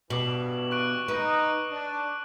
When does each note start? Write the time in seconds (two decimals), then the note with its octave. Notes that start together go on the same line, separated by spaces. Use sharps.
0.10 G2 B2 E3 D6 F#7
0.71 C#6 F#6 D7
1.08 D#4 B4 D7 D#7
1.70 D4